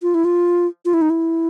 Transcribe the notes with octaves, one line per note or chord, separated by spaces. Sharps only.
F4
E4
F4
F4
E4
D#4
E4